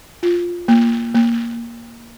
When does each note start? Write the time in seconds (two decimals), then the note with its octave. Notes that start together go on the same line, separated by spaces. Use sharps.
0.23 F4
0.68 A#3
1.15 A#3